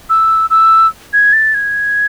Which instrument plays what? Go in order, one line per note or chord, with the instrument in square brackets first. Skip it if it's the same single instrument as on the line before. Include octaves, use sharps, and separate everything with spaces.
[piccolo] E6
E6
G#6
A6
G#6